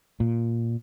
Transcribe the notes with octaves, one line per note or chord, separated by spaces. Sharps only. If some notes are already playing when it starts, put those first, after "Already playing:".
A#2